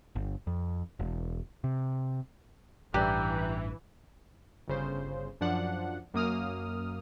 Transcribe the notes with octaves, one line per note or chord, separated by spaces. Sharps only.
G1
F2
E1
C3
A1 G2 E3 G4 D5 A#5 F#6 G6
G1 C#3 C5
F#2 F3 D4 F#5
F#2 A#3 D#6 F6